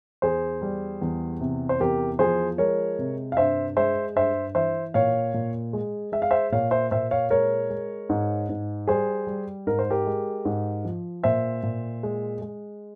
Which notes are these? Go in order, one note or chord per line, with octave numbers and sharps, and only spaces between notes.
E2 G#4 C5
G3
E2
C3
C5
E2 G4 A#4
F3 G#4 C5
G#3 A#4 C#5
C3
F5
G2 C5 E5
G#3 C5 E5
G2 C5 E5
E3 C5 E5
A#2 C#5 F5
A#2
G#3
G#3 E5
F5
C5 E5
A#2 C#5 F5
C5 E5
A#2 C5 E5
C#5 F5
G#3 A#4 C#5
G#3
G#2
G#2
G3 G#4 C5
G3
G#2 A#4
C5
G4 A#4
G#3
G#2
F3
A#2 C5 E5
A#2
G#3
G#3